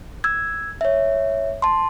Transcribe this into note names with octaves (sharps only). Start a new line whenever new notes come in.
E6 G#6
C#5 E5
A5 C6